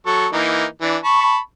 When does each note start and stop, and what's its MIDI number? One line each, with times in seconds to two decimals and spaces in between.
0.06 0.27 54
0.06 0.27 69
0.06 0.27 85
0.33 0.65 52
0.33 0.65 58
0.33 0.65 63
0.81 0.97 52
0.81 0.97 62
1.04 1.38 81
1.04 1.38 83
1.04 1.38 85